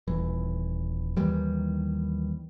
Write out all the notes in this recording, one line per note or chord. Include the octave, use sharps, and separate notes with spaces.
D#1 E3
D#2 D#3 E3 G3